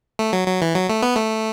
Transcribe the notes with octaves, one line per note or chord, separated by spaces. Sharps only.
A3
F#3
F#3
E3
F#3
A3
B3
A3